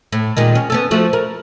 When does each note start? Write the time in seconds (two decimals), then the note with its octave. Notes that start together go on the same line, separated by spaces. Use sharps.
0.12 A2
0.37 A#2 D#3 G#3
0.55 C#4
0.70 B3 C#4 A4
0.91 F3 A3 F#4
1.13 A#4